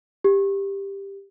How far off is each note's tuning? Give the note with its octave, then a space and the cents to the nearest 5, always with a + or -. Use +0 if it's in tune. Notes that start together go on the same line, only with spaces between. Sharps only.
G4 +10